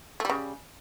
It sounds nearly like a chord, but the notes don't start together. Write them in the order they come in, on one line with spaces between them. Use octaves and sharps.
A3 G3 C#3